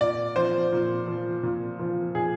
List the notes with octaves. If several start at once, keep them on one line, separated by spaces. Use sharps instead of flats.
A#2 D5
F3 C5
A#2
F3
A#2
F3
A#2 G#4